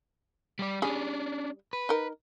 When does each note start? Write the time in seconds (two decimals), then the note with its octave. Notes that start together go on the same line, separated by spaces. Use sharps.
0.59 G3 D5
0.82 G3 C#4 D4 G#4
1.73 B4
1.89 D#4 A#4